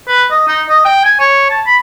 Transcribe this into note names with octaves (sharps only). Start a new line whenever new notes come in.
B4
D#5
D#4
D#5
G5
G#5
C#5
A5
B5